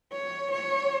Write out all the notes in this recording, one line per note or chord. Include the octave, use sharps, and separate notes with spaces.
C#5
C#5